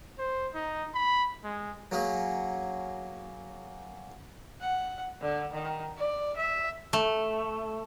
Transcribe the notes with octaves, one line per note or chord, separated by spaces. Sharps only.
C5
D#4
B5
G#3
F#3 A#3 C#4 G#4
F#5
D3
D#3
D5
E5
A3